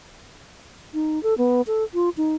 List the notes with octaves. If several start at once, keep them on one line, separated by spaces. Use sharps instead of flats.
D#4
A4
B3
A4
F4
D#4